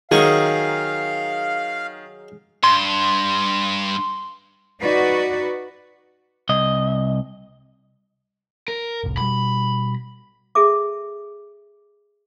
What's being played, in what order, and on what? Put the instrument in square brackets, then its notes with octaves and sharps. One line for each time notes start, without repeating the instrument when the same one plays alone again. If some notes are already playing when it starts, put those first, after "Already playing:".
[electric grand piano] D#3 [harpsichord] F#3 D#4 C#6 [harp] G#4 [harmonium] F5
[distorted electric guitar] G2 [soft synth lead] C6
[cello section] D#4 F#4 B4 D5
[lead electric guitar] C2 D#5
[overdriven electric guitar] A#4
[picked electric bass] F1 C2 A2
[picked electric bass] B2 G3 [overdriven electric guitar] B5
[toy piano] G#4 A4 E5 D6